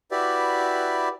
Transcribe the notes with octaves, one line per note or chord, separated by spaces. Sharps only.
E4 F#4 G4 B4 D5 E5